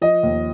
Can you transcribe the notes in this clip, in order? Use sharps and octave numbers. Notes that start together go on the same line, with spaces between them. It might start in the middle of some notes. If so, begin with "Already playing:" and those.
F3 D#5
D#2